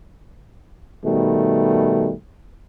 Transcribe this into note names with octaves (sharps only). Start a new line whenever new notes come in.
B2 D#3 G3 A3